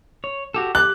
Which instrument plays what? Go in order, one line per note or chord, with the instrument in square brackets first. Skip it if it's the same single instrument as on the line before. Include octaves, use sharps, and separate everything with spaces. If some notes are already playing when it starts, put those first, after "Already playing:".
[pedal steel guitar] C#5
F#4 G4 A4
[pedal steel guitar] G4 D6 [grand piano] F#6